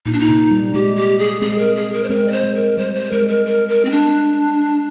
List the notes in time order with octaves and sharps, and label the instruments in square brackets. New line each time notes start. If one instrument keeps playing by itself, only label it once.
[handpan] A#2 [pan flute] D#4
[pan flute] D4
D#4
[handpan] C3
G3
[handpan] G#3 [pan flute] G4
[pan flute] G4
G#4
[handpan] G#3 C4 [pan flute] G#4
[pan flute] A#4
G#4
A#4
C5
[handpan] G#3 C4 [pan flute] A#4
[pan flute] D5
C5
[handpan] G#3
[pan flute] A#4
[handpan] G3 [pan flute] C5
[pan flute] C5
[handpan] G#3 [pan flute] A#4
[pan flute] A#4
A#4
A#4
C4
D4